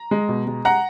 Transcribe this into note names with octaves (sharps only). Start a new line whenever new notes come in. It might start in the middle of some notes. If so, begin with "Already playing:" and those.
Already playing: A#5
G#3
B2
G#3
F#5 A#5